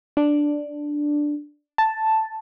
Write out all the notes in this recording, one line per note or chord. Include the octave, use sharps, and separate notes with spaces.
D4
A5